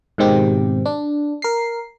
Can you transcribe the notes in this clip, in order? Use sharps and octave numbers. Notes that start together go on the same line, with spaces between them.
G#2 B2 D#3 G#3 C4 G4
D4
A#4 C7